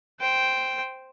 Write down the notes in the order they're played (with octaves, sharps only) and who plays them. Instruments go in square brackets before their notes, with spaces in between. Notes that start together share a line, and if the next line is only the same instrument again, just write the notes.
[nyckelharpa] C5 G5